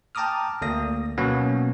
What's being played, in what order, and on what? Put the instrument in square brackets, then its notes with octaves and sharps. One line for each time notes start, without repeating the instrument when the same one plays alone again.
[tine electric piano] G5 A5 A#5 D6 D#6 F6
D2 A#3 D#6 A#6
B2 F#3 A#3 B3 C#4